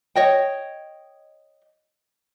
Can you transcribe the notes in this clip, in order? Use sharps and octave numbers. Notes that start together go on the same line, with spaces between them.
C#5 D#5 G5